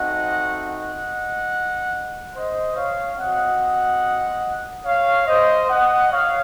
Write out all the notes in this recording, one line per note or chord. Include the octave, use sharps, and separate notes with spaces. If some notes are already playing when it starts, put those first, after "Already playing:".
Already playing: A3 C4 D#4 F#4 D#5 F#5
D#5 F#5
C5 D#5
C#5 F5
C4 F#4 D#5 F#5
C#5 F5
C5 D#5
D#5 F#5
C#5 F5